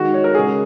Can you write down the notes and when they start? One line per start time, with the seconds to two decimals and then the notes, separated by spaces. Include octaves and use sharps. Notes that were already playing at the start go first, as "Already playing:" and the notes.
Already playing: D#3 G#3 F#4
0.14 C#5
0.24 A#4
0.35 C#3 G#3 G#4